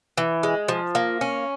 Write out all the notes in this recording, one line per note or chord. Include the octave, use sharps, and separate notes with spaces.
E3
G#3
F3
A#3
C#4